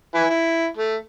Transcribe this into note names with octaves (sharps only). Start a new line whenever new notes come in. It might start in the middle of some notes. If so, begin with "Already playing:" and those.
E4 B4 G#5
E4
A3